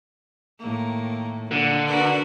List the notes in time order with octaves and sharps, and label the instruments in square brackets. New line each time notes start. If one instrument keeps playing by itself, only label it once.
[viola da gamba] A2 D#3 A#3
[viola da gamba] A#2 [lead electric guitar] D3
[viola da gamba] F#4 A#4 B4